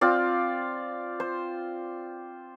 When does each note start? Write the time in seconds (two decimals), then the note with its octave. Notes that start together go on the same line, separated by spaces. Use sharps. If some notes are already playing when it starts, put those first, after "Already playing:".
0.01 C4 F4 D5
1.20 C5